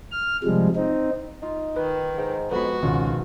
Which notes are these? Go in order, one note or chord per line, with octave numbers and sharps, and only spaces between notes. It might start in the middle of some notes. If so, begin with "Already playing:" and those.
F6
C3 F3 G3 G#3
C4 D#4
D#4 F4
D#3 B4
G#2 G5 A#5
F2 G#3 B3 F#4 B4 B5
G#1 C#2 B2 D#3 C#4 F4